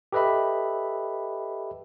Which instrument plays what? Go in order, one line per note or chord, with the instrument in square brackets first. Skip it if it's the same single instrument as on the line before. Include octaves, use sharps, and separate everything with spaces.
[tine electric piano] G4 A4 B4 D#5 E5 B5